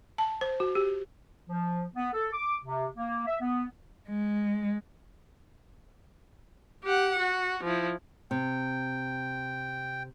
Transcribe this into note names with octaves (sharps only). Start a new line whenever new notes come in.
A5
C5
F#4
G4
F3
B3
A4
D6
C3
A#3
E5
B3
G#3
G4 F#5
F#4
F3 E4
C3 G5